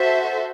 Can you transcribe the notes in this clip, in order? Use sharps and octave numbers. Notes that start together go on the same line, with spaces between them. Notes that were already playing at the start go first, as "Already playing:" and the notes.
Already playing: F#4 A4 C5 E5